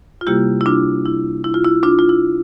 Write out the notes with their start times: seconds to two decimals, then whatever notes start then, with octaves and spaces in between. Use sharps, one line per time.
0.21 F4
0.27 C3 G3 A#3 E4 G4
0.61 E4
0.66 D4 F4
1.05 E4
1.44 E4
1.54 F4
1.64 E4
1.83 D4 F4
1.99 F4
2.09 E4